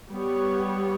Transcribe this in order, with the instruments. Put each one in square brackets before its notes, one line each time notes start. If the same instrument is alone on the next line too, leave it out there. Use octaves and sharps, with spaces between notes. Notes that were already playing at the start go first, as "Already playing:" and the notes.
[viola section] G3 B3 G4 C#5